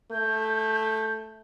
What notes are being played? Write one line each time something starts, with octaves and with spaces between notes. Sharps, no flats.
A3 G6